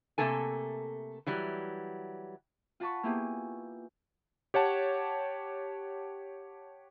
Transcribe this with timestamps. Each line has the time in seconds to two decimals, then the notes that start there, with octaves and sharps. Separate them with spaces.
0.18 C3 E3 A3 A#3 A4 G#5
1.27 E3 F#3 G3
2.80 F4 F#5 A5 B5 C#6
3.03 A#3 B3 E4 F4 G4 G#4
4.54 G4 C#5 F#5 A5